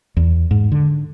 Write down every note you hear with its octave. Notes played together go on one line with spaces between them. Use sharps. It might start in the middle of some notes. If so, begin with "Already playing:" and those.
E2
G#2
D3